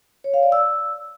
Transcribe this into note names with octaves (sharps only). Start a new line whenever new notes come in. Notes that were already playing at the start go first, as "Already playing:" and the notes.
C#5
F5
D5
E6